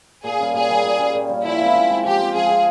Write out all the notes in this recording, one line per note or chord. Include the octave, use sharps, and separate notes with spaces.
A#2 G#4
G3 C#4
A#2 G#4
G3 C#4
A#2
G3 C#4
A#2
G3 C#4
F3 E4
G#3 C4 F4
F3
G#3 C4 F4
F3 G4
G#3 C4 F4
F3 G#4
G#3 C4 F4